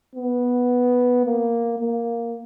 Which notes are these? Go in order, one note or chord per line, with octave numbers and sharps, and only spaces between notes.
B3
A#3
A#3